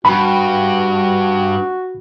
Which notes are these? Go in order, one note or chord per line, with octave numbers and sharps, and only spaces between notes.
G2 F#4 B5